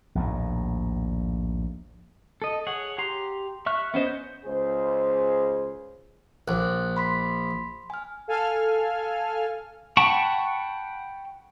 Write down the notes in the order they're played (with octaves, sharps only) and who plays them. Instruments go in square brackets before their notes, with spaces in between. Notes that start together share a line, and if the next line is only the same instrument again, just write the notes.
[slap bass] A#1 D#2 A2
[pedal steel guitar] A4 D#5
G#4 C#5 F#5
G4 A#5 C6
E5 C#6 F6 F#6
B3 C#4 C5 D#5
G6
[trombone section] C#2 G#4 C5
[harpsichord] A#1 [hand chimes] F#6
[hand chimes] B5 C6 B6
G#5 F6
[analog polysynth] A4 F5 G#5 F6
[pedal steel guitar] F#5 G5 A5 B5 C#6